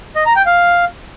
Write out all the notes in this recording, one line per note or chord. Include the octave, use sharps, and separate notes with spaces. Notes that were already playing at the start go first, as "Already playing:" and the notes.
D#5
A#5
G5
F5